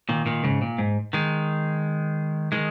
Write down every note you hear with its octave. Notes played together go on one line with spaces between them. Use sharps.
A#2 D#3
A#2 D#3
G#2 C#3
A#2
G#2
D#3 G#3
D#3 G#3